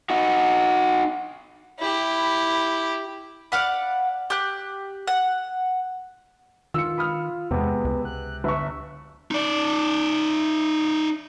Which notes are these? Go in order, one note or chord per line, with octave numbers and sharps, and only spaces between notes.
D#4 F#4
E4 G4
D5 F5 F#5 B5
G4 F#6
F#5
D#3 F4 E6 C#7
B5 D#6 F6
E2 C3 G#3 B3
C#2
F#6
G1 E5 C#6
D#4 D5